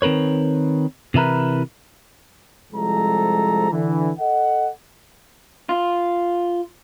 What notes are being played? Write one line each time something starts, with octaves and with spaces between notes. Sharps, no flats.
D#3 C4 A#4 B4 C#5
C3 E3 E4 A#4 B4
C2 F3 G#3 A4 A#5
D3 E3
A4 D#5 F#5
F4